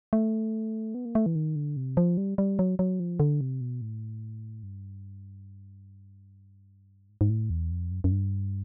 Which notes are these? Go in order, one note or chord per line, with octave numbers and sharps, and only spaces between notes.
A3
B3
A#3
A3
E3
D#3
D3
C3
F3
G3
G3
F#3
F#3
F3
D3
C3
B2
A2
G2
G#2
G#2
A2
E2
F2
F#2
F#2
G2